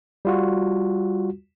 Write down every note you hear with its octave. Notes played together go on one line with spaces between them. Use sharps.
G3 F4 F#4